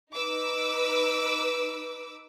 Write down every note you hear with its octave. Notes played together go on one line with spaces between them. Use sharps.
D#4 B4 D6 E6